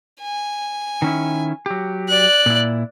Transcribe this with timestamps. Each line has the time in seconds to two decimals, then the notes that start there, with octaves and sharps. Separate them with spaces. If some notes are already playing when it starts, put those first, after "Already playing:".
0.21 G#5
1.02 D#3 C#4 E4
1.66 F#3 G4
2.09 D5 F#6
2.46 A#2 E4